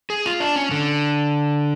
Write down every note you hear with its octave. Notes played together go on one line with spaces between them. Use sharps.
G#4
F4
D4
C#4
D3